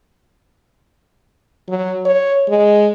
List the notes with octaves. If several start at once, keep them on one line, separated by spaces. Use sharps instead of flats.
F#3
C#5
G#3